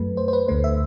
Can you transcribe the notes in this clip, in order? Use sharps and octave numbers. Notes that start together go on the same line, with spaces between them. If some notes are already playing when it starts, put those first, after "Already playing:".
Already playing: F#2 F#3 A3 B4
C5
C5
B4
D2 D3 A3 C5
E5